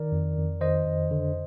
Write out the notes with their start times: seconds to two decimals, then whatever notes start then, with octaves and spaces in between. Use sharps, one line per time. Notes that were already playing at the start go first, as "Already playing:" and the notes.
Already playing: D#3 A#4 D5
0.12 F2
0.37 F2
0.61 D#3 C5 D#5
0.86 F2
1.11 D3